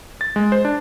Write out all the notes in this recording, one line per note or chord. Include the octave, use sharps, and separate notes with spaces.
A6
G#3
C5
D4